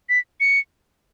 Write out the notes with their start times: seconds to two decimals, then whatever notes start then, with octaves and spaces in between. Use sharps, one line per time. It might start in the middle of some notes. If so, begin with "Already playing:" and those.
0.09 B6
0.40 C#7